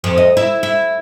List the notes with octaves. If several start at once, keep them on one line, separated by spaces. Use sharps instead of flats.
F2
D#5
E4
E4